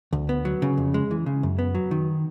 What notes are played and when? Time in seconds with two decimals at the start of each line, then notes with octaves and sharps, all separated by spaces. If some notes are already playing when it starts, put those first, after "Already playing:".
0.13 D2
0.29 B3
0.45 F#3
0.62 C#3
0.77 F2
0.94 G#3
1.11 E3
1.26 C#3
1.43 F#2
1.59 B3
1.75 F#3
1.91 D#3